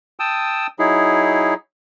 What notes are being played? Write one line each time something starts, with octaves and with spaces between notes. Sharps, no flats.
G5 A5 D#6 E6
F#3 D#4 E4 G#4